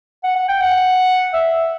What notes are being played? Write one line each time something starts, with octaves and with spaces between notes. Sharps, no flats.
F#5
F#5
G5
F#5
E5